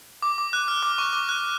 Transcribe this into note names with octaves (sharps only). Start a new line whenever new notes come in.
D6
D6
F#6
F6
D6
C#6
D6
F#6